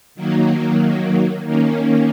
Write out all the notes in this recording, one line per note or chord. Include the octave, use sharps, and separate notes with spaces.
D#3 F#3 A#3
D#3 A#3 C#4